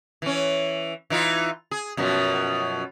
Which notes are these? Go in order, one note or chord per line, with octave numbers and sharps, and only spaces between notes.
E3 C#4
E3 D#4 F4
G#4
F#2 B2 F3